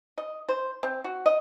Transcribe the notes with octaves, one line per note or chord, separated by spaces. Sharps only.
D#5
C5
C4
F#4
D#5